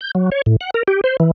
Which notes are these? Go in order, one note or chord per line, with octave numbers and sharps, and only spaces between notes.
G6
F#3
C#5
A2
F#5
A#4
G4
C5
E3